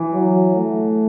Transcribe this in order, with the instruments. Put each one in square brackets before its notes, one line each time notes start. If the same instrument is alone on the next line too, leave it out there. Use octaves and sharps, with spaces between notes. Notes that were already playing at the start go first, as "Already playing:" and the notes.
Already playing: [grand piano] E3
[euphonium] F#3
A3